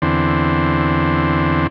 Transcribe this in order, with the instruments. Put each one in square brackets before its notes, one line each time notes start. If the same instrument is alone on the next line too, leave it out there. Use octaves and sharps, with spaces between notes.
[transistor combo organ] E2 D3 C4